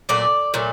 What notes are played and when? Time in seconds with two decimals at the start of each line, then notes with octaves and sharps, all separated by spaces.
0.09 A#2 F#3 A3 D5
0.54 A#2 F#3 A3